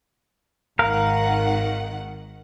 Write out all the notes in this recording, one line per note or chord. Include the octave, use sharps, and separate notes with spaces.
G#1 D#3 A#4 F5 F#5